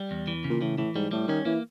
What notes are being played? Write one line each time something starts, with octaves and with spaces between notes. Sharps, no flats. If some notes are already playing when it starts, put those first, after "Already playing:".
Already playing: G3
E2
E3
C#3
A#2
A2 E3
A2 E3
G#2 G3
A2 G3
D#3 C#4
E3 A#3